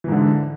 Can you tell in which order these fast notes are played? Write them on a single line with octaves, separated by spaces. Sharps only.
E3 G#2 D3